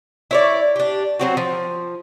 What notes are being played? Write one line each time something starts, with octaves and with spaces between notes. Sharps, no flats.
E4 C#5 D5
D4 G4
F#3 C4 F#4
F3